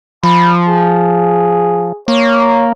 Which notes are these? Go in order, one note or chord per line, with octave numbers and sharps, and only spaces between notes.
F3 B5
G#4
A#3 C#5